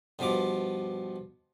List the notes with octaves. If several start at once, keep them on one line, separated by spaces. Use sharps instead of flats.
G2 B2 F3 D6